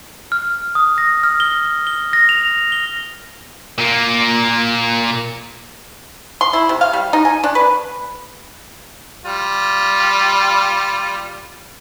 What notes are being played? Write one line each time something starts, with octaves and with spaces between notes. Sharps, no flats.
F6
D#6
A#6
F6
G7
G7
A#6
F7
G7
A#2 A#3
C6
E4
C3
F5
G3
D#4
G#5
D4
B4
G3 F4